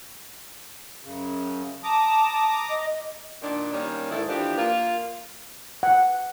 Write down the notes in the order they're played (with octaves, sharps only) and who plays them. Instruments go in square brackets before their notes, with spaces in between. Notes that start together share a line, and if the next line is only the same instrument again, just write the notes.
[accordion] F#2 C#3
[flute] A5 [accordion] A#5 D6 D#6
[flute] D#5
[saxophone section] A#2 D#3 D4
D#3 G3 A#3 C#4
G#2 D#3 E4 A4
E3 F3 D4 G4
A#3 F4
[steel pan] F#5